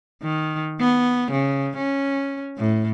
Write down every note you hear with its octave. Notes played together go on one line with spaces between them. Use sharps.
D#3
B3
C#3
C#4
A2